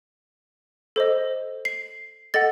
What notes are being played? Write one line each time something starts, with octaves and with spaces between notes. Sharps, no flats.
A4 C5 D#5
C7
A4 D#5 F#5 A6